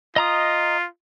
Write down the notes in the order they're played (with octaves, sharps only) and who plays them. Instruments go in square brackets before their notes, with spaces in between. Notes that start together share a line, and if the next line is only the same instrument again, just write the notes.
[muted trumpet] F4 [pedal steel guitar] D#5 A#5 D#6